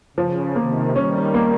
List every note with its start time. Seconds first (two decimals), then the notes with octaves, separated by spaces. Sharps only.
0.17 C#3 F3
0.56 C3 D#3 A#3
0.95 D#3 G3 C#4
1.34 A#3